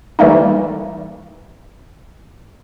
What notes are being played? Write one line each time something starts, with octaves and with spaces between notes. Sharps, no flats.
E3 G3 A3 A#3 D#4